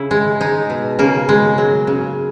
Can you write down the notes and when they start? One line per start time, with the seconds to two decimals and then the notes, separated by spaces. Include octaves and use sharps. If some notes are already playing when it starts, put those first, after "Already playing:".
Already playing: C#3 E4
0.11 G#3
0.41 G#3 D#4
0.70 B2
0.99 C#3 A#3
1.29 G#3
1.58 F#3
1.87 C#3